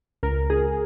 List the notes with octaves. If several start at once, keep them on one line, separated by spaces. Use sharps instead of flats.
C#2 A#4
C#2 G#4